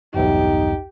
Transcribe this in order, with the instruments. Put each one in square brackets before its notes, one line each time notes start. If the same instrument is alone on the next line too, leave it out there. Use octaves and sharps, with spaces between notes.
[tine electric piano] B1 E2 G2 [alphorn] D#4 [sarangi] G4